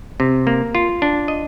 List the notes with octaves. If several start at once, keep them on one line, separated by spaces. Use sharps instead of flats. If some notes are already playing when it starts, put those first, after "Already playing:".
C3
A#3
F4
D4
D#5